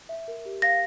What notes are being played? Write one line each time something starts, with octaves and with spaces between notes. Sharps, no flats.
E5
A#4
G4
F5 A#6